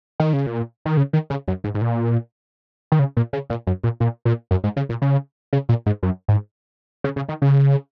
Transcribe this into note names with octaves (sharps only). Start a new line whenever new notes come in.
D#3
C#3
A#2
D#3
C#3
D#3
C#3
F#2
G#2
G#2
A#2
D#3
C#3
A#2
C#3
A#2
F#2
A#2
A#2
A#2
F#2
G#2
C#3
A#2
C#3
C#3
A#2
G#2
F#2
G#2
C#3
C#3
D#3
C#3